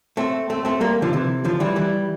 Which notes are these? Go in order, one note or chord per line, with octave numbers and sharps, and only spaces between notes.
A3 C4
A3 C4
A3 C4
G3 A#3
D3 F3
C3 E3
D3 F3
E3 G3
E3 G3